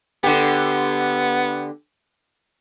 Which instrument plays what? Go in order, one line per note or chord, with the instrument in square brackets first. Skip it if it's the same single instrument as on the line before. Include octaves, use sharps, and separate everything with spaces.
[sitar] D3 G4 [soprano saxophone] B3